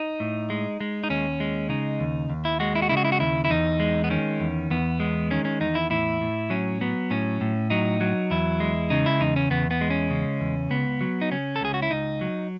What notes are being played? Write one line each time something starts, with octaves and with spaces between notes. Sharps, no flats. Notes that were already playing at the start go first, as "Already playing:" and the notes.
Already playing: D#4
A2
G#3
G#3
D#4
D#2 C#4
G#3
C#3 D#4
D#2
D#2
E4
G#3 F#4
E4
F#4
C#3 E4
F#4
E4
F#4
D#2 E4
E4
E2 D#4
G#3
B3
D#3 C#4
E2
E2 B3
G#3
D#3 C#4
C#4
E2 D#4
E4
A2 E4
A2
F#3 C#4
F#3 B3
A2 C#4
A2
F#3 D#4
F#3
E2 E4
G#3
C#3 D#4
E4
E2 D#4
C#4
E2 B3
B3
G#3
C#4
C#3
E2
C#2 B3
F#3
D#4
C#3 C#4
A4
C#2 G#4
F#4
E4
C#2 D#4
F#3